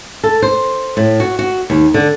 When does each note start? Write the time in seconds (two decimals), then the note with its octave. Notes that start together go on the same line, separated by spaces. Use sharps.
0.24 A4
0.42 C5
0.97 A2
1.20 F#4
1.39 F#4
1.70 D#2
1.94 D3